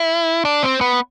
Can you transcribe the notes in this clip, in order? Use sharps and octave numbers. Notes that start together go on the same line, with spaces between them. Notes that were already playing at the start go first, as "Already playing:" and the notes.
Already playing: E4
D4
C4
B3